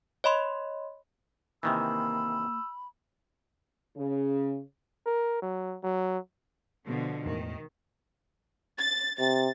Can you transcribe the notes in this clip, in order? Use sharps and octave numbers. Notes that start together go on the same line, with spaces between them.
C#5 D#5 B5 C6
C3 D#3 E3 A#3 B5 E6
C#3
A#4
F#3
F#3
B2 D3 F3
E2 A2 D#3 G#3
A6
C3 A6